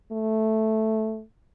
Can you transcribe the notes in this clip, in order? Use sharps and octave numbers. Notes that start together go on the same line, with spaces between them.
A3